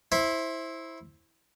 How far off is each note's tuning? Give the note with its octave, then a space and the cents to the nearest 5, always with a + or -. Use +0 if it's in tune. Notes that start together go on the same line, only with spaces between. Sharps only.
E4 -10 C5 +15